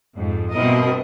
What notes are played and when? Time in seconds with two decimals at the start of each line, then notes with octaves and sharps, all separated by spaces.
0.17 F2 G#2
0.52 G2 B2 C4 E4 A#4 D#5